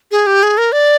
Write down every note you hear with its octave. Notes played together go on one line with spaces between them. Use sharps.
G#4
G4
G#4
A#4
D5